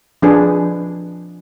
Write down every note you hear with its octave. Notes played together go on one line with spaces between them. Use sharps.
F3 D4 G#4 B4